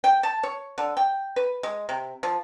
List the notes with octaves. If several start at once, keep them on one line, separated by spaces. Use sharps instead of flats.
G5
A5
C#5
D3
G5
B4
G#3
C3
F3